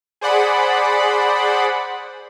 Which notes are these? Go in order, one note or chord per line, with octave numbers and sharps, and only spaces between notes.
G#4 C5 D5 F#5 B5